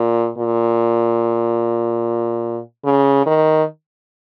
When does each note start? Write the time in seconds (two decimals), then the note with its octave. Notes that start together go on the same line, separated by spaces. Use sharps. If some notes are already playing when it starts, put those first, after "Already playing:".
Already playing: A#2
0.38 A#2
2.85 C#3
3.26 D#3